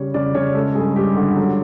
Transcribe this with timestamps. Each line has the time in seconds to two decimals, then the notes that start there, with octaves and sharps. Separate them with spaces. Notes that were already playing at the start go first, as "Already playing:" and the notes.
Already playing: C#3 G3 C#5
0.14 C#3 D5
0.35 C#3 C#5
0.54 G#3 A4
0.75 G2 G#4
0.96 G2 G4
1.17 D3
1.36 F#3